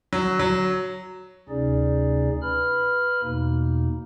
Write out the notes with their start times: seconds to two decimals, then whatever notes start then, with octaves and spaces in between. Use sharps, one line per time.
0.13 F#3
0.39 F#3
1.49 D2 C3 C#4 D#4 G#4 D5
2.42 B4 B5 F6
3.23 E2 B2 A#3 D#4